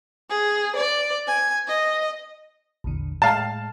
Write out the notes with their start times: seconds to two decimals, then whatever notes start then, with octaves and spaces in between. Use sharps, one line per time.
0.30 G#4
0.76 D5
1.26 G#5
1.66 D#5
2.84 A#1 E2 D3
3.22 A2 G#3 F5 G5 A5